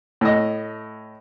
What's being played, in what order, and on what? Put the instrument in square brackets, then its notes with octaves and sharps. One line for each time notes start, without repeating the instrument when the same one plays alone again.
[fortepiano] A2 D#5